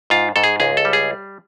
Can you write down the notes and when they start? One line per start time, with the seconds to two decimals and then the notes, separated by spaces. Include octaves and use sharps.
0.10 G#2 F4
0.36 G#2 A4
0.44 G#4
0.60 C#2 G#4
0.77 A4
0.85 G3
0.93 G#4